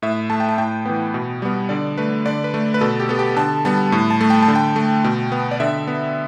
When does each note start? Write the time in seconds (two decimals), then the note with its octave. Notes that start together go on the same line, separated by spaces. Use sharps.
0.02 A2 E5
0.30 A3 A5
0.40 G5
0.49 A5
0.58 A2 G5
0.85 E3 B3
1.14 B2
1.42 G3 B3
1.69 D3 D5
1.98 A3 B4
2.26 D3 D5
2.44 B4
2.54 A3
2.74 B4
2.81 B2 A4
3.00 G4
3.09 B3 A4
3.19 G4
3.36 D3 A5
3.65 G3 B3 A5
3.92 A2
4.10 A5
4.21 A3
4.30 G5
4.42 A5
4.48 D3
4.55 G5
4.76 A3
5.04 B2
5.32 B3
5.51 D5
5.60 D3 E5
5.87 B3